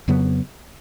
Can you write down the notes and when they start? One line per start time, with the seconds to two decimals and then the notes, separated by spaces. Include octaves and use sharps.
0.08 F2 C#3 F#3 B3